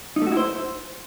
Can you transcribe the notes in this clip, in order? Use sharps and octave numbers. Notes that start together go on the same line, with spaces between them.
D#4
A3
F#4
E4
C5